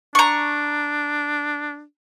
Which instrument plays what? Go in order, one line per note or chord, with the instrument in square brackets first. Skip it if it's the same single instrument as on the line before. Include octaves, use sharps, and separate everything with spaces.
[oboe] D4 [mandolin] A#5 C#6